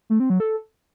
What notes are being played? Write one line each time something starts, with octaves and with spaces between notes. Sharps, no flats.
A3
C4
F#3
A4